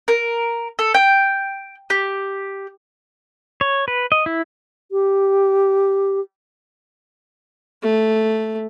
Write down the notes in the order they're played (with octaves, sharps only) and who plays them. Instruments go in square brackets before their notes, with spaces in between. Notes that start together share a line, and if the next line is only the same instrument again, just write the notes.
[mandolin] A#4
A4
G5
G4
[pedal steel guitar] C#5
B4
D#5
E4
[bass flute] G4
[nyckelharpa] A3